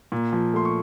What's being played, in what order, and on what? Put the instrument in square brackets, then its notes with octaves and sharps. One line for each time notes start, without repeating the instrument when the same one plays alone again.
[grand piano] A#2
F3
A3 C6
C#6